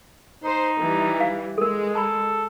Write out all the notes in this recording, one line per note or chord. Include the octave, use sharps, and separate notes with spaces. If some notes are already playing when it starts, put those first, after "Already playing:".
D#4 C5
E3 G3
F5
G#3 A4 A#4
A4 A#5 B5